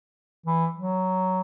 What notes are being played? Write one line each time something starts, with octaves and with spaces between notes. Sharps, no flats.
E3
F#3